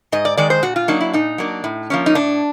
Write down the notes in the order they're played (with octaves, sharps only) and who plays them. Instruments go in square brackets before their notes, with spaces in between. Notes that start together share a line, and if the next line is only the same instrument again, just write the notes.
[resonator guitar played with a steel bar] G#2 D#5
D5
D#3 G#3 D5
C5
A#2 F#4
F4
F#3 A#3 D4 D#4
E4
A#2 D#4
F#3 A#3 D4
A2
F3 A#3 C#4
D#4
A2 D4